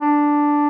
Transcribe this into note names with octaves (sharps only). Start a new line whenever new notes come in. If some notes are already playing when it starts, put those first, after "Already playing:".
D4